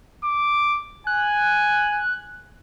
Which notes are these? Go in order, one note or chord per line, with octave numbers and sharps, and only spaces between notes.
D6
G#5 F#6